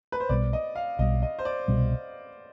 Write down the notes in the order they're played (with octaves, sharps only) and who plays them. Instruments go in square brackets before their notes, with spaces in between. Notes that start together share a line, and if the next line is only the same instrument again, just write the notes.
[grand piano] B4
C5
[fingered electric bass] B1 B2 G3 [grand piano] D5
[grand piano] D#5
F5
[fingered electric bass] B1 B2 G3 [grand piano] D#5
[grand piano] D#5
C5
D5
[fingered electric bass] C2 B2 G3